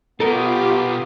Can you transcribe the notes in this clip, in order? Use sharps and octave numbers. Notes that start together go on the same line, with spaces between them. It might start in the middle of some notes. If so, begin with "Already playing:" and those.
B2 B3 D#4 F4 G4 A4 A#4 D6